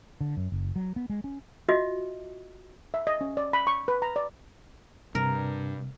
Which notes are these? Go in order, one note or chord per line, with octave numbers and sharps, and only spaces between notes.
D3
F#2
F#1
F#3
B3
G#3
C#4
F4 F#4 D#5 E5
E5
D#5
C#4
D5
B5
C#6
B4
A#5
D5
G2 C3 A#4